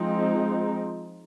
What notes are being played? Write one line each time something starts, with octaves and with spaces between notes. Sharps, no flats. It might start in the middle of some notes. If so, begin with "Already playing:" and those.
Already playing: F3 G#3 C4 D#4